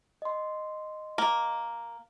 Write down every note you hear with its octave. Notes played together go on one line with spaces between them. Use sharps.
D#5 C6
A#3